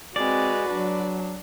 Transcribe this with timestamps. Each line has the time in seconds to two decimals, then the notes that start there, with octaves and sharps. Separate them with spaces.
0.16 G#3 C4 F#4 B4 D5
0.70 F#3 D4